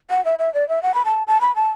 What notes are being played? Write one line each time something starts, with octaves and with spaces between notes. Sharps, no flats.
F#5
E5
E5
D5
E5
F#5
B5
A5
A5
B5
A5